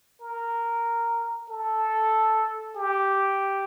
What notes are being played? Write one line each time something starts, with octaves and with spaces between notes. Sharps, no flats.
A#4
A4
G4